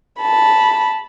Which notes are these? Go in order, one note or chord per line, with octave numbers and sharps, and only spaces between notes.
A5 B5